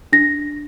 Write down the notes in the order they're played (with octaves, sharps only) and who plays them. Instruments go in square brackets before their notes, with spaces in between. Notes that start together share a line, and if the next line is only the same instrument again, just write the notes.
[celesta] D4 A#6